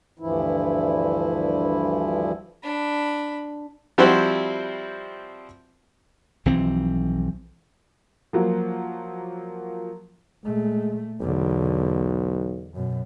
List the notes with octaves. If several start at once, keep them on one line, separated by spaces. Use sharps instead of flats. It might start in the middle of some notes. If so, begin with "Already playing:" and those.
D2 G2 E3 F3 E4
D4 B5
F3 G3 C4 E4 F#4 C5
B1 E3 F3 C4
F3 F#3 A#3
A#2 G#3 A3
B1 E2 D3
F#2 B2